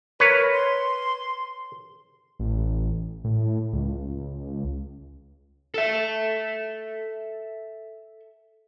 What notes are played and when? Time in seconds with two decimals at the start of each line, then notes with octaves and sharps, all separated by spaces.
0.20 A#4 B4 C#5
0.53 C6
2.39 A1
3.24 A2
3.73 C#2
5.74 A4 E5